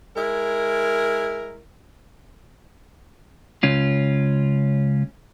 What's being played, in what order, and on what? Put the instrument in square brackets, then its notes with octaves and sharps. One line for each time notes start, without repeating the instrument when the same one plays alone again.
[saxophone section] G#3 E4 A#4
[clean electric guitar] C#2 C#4 F4